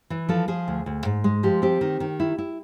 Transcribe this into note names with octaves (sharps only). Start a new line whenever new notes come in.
E3
F3 A4
F3 G#4
D2
D2
G#2
G#3
F3 G4
C4 G4
D#3
D#3
E4
E4